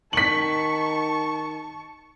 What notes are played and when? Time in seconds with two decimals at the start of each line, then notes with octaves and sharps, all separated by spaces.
0.13 D#3 A5 C#6 B6 F#7